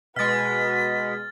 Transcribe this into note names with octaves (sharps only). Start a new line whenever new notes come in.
B2 G#3 F#4 B4 F6 A6 B6